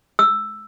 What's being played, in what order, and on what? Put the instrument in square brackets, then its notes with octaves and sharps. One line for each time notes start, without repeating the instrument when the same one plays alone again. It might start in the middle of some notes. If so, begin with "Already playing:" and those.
[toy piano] E6